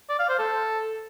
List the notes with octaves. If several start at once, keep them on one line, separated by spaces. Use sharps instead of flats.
D5
F5
C5
A4